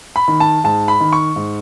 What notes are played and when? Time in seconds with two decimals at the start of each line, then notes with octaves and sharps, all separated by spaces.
0.16 B5
0.28 D#3
0.40 A5
0.64 G#2 A5
0.88 B5
1.00 D#3
1.13 C#6
1.36 G#2